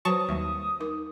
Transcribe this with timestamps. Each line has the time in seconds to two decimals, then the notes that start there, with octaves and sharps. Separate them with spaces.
0.05 F#3 F#4 B4 C5 A5 C#6 D#6
0.29 D#2 F#3 G3
0.80 D#4 A#4 D6